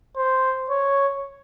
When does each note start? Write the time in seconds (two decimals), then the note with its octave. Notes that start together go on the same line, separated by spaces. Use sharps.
0.17 C5
0.70 C#5